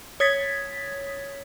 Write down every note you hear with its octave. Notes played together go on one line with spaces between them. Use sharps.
C#5 D#6 G#6 A6 B6